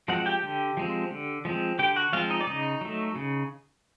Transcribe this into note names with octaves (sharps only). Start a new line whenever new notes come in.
F3 G#3 C4 F#4 F#5
G4 G5
D3
F3 G#3 C4
D3
F3 G#3 C4
D3 G4 G5
F#4 F#5
F3 G#3 C4 F4 F5
D#4 D#5
D5
C#3 D#4 D#5
F#3 A3
C#3